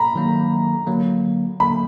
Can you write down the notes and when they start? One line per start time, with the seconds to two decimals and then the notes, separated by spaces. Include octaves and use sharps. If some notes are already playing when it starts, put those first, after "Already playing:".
Already playing: A#5 B5
0.15 D#3 F#3 A#3
0.87 D3 F#3 A#3
1.60 D3 F#3 A#3 B5